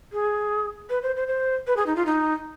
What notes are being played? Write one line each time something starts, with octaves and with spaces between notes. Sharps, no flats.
G#4
B4
C5
C5
C5
B4
G#4
D#4
F4
D#4